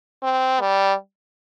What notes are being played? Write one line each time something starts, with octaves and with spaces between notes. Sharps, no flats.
C4
G3